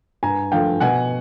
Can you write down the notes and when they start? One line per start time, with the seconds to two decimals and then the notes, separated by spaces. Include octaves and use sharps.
0.23 G2 G#5 A#5
0.52 D3 F3 A3 F5 G5
0.80 B2 F#5 G#5